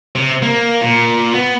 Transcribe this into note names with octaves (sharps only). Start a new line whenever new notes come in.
C3
A#3
A#2
B3